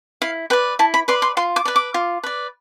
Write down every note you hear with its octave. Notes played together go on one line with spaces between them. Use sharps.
E4 F5
B4 D5 G5
E4 A5
B5
B4 D5 C6
C6
F4 C6
D6
B4 D5
D6
F4
B4 D5